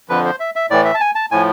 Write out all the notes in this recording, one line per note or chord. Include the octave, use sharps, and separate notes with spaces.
F2 D3 F3 B4
C5
E5
E5
A2 E3 D5
E5
A5
G#5
A5
A2 F3 G#5